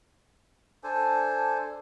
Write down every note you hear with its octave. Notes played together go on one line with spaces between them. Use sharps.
D4 A4 C5 G#5